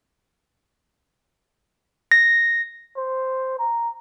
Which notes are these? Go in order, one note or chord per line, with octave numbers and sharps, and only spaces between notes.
A#6
C5
A#5